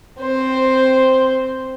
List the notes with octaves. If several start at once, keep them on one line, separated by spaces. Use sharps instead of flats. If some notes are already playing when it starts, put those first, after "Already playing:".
C4 C5